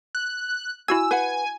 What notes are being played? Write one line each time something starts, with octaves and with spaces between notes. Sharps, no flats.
F#6
E4 F#4 G#5 E6 G#6
B4 F#5 G#5